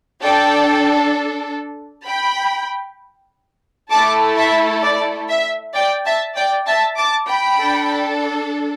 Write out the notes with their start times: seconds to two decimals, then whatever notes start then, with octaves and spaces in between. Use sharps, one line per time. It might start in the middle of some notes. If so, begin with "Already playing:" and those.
0.23 D4 A4 D5 G5
2.07 G5 B5
3.91 A3 E4 A4 A5 D6
4.37 E5 A5
4.83 D5
5.29 E5
5.75 D5 G5
6.06 E5 A5
6.36 D5 G5
6.67 E5 A5
6.98 A5 D6
7.28 G5 B5
7.59 D4 A4